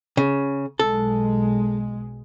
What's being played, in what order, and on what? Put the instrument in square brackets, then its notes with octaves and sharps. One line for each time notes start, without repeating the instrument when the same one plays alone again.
[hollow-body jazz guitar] C#3
[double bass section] B1 G#3 [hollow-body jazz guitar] A4